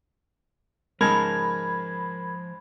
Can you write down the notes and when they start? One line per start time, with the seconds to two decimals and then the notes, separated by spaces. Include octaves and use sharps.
1.01 G#2 C#3 F3 G#3 A#4 A5 B5 G#6